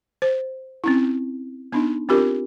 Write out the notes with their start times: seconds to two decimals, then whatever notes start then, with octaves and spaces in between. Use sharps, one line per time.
0.22 C5
0.84 C4 C#4 E4
1.72 B3 D4 D#4
2.09 C4 D4 F4 G4 A#4